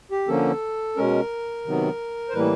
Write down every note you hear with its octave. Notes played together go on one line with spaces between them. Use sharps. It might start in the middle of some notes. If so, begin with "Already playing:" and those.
G4
D3 F3 A#3 C#4 A4
B2 G#3 C#4 A#4
C3 D#3 F#3 B3
C5
A2 E3 G3 A#3 B4